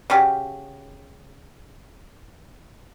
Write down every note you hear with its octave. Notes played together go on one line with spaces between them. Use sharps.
C#3 F#4 G4